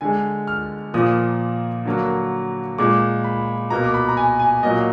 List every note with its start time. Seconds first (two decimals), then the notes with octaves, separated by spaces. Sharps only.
0.01 D3 G#3 G#5
0.47 F6
0.94 A#2 F3 A#3 D#6
1.86 D3 F#3 A#3
2.78 A#2 G#3 D6
3.24 B5
3.70 B2 A#3 A#5
3.84 D6
3.94 B5
4.09 A#5
4.17 G#5
4.39 G#5
4.63 A#2 F#3 A#3 D#5